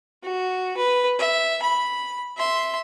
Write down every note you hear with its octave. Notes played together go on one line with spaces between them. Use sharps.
F#4
B4
E5
B5
E5 C6